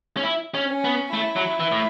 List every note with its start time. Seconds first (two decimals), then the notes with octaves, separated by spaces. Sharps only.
0.17 C#4
0.23 E4
0.54 C#4
0.68 C#4
0.85 B3
1.13 A3 E4
1.36 F#3
1.60 E3
1.72 A2